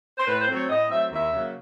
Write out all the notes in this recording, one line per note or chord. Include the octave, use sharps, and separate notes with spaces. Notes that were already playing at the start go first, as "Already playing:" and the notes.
C5
A2 B4
C5
F#3 A3 C4
C#5
A2 D#5
F#3 A3 C4 E5
D#2 E5
C#3 F#3 A#3